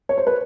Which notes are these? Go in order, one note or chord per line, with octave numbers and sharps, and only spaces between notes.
C#5
C5
B4